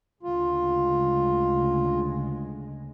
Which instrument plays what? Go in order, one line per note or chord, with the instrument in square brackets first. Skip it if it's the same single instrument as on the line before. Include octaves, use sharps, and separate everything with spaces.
[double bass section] D2 C#3 G#3 [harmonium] F4